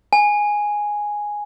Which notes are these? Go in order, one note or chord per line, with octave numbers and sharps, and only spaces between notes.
G#5